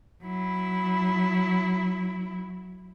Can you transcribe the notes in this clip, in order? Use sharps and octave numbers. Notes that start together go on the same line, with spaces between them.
F#3 E4